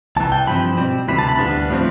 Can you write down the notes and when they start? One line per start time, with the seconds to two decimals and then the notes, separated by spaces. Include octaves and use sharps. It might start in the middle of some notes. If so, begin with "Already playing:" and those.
0.16 C2 C3 E3 A5
0.32 G5
0.47 G2 F3 C4 B5
0.77 B2 G3 C4
1.08 D2 C3 E3 B5
1.18 A5
1.29 B5
1.39 D2 C3 G3 B3 D4
1.70 A2 F3 C4